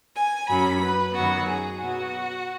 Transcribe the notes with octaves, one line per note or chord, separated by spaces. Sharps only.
G#5
F#2 F#3 C#4 B5
B4
F#2 D#3 F#3 B3 F#4
G#4
B2 F#3 B3 F#4